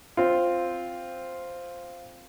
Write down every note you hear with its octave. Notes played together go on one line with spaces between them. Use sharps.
C4 F4